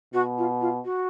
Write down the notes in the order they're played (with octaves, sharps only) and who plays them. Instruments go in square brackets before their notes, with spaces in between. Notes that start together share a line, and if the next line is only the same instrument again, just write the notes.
[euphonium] B2 [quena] F#4
[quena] F4
F4
F#4